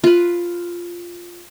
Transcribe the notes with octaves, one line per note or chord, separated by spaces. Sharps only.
F4 B4